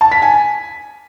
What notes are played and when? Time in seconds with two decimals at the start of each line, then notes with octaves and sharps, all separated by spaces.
0.01 A5
0.12 B6
0.22 G#5